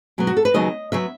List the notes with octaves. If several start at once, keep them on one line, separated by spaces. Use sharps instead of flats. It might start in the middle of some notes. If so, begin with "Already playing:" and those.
B2 F#3 B3
F#4
A4
B4
D#2 C#3 F#3 B3 D#5
C#3 F#3 B3 E5